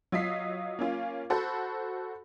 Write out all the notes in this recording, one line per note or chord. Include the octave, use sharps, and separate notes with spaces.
F#3 F4 D#5 B6 C7
A#3 C#4 F4
F#4 A4 C5 B5